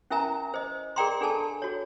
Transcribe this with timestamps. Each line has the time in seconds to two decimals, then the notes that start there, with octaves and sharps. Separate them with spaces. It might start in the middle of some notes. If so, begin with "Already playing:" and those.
0.11 C#4 E4 A#4 E5 G#5 A#5
0.54 C5 D#5
0.96 G#4 A#4 D5 G5 A#5 C6
1.21 D4 G#4 A4 G#5 A5
1.62 F#4 C#5